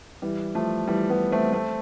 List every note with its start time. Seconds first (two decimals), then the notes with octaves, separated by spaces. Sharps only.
0.22 E3 G3
0.55 F3 A3
0.87 E3 G3
1.09 G3 B3
1.32 A3 C4
1.53 A3 C4